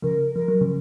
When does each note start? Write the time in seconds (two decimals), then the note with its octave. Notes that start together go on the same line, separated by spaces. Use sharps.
0.02 C#3 F3 A#4
0.35 F3 A#4
0.48 F#3
0.61 C#3 F3